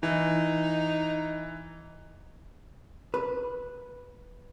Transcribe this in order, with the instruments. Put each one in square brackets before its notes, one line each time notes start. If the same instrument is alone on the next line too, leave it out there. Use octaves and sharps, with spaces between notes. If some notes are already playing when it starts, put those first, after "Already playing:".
[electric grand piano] E3 [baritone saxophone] D#4
[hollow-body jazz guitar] B4